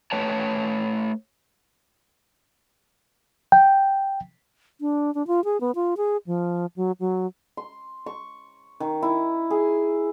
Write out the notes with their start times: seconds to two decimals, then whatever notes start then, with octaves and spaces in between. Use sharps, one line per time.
0.12 A3 B4 C#5 G5 A5
3.52 G5
4.81 D4
5.15 D4
5.27 F4
5.44 G#4
5.61 B3
5.75 F4
5.97 G#4
6.27 F3
6.76 F#3
7.00 F#3
7.57 C6
8.06 C#6
8.80 D#3
9.02 E4
9.50 G#4